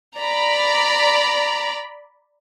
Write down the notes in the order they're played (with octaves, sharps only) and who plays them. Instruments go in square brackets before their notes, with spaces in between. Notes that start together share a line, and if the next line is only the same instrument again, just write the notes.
[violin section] D5 A#5 B5